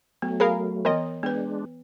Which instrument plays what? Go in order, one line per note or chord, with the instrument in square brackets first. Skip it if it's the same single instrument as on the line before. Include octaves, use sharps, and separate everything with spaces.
[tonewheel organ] F#3 A3 [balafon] B3
[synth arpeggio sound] G#4 A#4 F5 [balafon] B5
[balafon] E3 B3 [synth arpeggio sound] A#4 D#5
[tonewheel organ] G#3 D4 [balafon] B3 B4